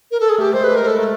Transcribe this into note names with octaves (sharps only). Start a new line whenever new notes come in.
A#4
A4
G#4
A3 G4
G#3 C5
B4
A#4
A4
A3 A4